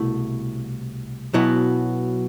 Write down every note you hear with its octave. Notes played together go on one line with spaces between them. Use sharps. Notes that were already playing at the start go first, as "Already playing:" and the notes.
Already playing: C2 B2 A3 E4
B1 B2 F#3 B3 E4